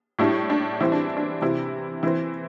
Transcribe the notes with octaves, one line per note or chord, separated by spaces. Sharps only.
A2 G3 D4 E4
D4
E3 G3 C4 E4
D4
D4
C3 E3 C4 E4
E3 C4 E4